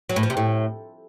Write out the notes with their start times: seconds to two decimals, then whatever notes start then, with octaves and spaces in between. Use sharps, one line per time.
0.09 F#3
0.16 A2
0.23 F3
0.30 C3
0.37 A2